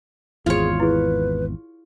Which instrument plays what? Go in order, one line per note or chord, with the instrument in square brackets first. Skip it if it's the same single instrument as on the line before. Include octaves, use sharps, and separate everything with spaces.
[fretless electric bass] G#1 E2 [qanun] F4 C#5 [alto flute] G#4
[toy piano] E4 G#4 [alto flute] B4